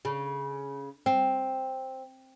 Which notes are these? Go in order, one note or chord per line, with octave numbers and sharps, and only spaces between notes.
C#3
C4